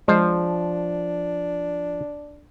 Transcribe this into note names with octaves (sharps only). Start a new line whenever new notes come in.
F3 G#3 D4 C5